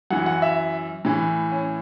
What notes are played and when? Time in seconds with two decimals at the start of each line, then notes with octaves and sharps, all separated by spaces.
0.10 F#2 E3 F#5
0.26 F#5
0.42 E5
1.05 A2 E3
1.52 C#4